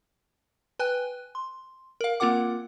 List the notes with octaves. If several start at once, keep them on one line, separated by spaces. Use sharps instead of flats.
B4 G5 G#5 F#6
C6
A#4 F5
A#3 C4 F4 A#4 F#5 D6